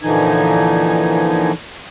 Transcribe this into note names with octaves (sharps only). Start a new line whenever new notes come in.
A#2 D3 E3 F3 D#4 G#5